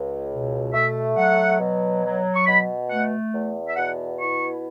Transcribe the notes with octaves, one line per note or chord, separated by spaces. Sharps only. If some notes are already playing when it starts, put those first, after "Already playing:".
Already playing: C#2
B2
A3 E5
F#3 F#5
B2
F#3
C#6
B2 B5
A3 F#5
E2
E5
B2 F#5
E4 C#6